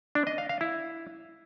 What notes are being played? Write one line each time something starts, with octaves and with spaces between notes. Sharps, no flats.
D4
D#5
F5
F5
E4